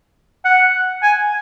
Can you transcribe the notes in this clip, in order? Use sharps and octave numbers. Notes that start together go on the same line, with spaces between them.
F#5
G#5